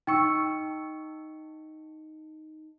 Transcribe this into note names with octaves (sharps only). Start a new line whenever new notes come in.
D#4 G5 C#6 E6 C#7